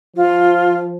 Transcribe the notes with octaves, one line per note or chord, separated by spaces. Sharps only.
F3 F4